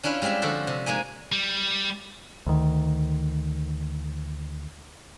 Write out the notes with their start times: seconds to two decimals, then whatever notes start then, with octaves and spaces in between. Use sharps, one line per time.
0.03 C#4 D4 E4 F4 B4
0.22 G3 G#3 C4 G4 E5
0.42 D3 F3 F#4 A4 C5
0.67 C3
0.86 G#3 A#3 D#4 G#5
1.32 G3
2.47 D2 D#3